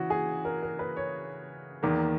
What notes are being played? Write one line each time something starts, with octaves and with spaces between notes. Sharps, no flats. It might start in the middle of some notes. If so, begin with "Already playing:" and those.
Already playing: C#3 E3 F#4
G#4
A#4
A#4
B4
C#5
E2 D#3 A#3